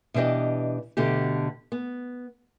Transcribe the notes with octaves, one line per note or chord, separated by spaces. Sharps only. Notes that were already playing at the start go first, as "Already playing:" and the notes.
B2 E3 D4 G4 D#5
D2 B2 D3 G4
B3